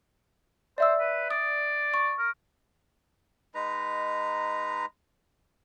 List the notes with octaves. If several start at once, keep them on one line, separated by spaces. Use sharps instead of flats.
C5 D5 E5 E6
B4
D5 D#6
C#6
A#4
G#3 D#4 B4 A#5